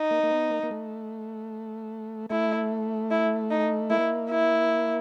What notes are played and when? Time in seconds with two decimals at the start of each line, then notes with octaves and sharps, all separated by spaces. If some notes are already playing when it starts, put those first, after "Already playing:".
Already playing: D#4
0.11 A#3
0.23 A#3
0.31 B3
0.50 A#3
0.63 A#3
0.71 A3
2.30 A3 E4
3.11 E4
3.51 D#4
3.90 A#3 E4
4.30 E4